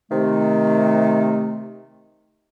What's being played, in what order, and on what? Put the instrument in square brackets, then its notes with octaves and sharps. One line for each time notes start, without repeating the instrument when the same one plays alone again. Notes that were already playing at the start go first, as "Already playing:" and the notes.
[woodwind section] C3 D#3 A3